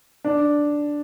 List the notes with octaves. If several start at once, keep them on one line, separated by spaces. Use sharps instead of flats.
D4